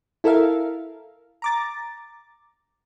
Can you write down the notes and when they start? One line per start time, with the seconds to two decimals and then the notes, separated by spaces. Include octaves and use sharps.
0.24 E4 A4 A#4 E5 F5
1.42 A#5 D6 A6